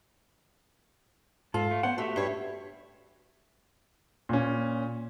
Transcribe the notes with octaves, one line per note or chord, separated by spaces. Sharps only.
G#2 F4 A4
A3
B3 C#4 C5 F#5
A3 F#4 G4 E5
G2 C#5
A#2 C#4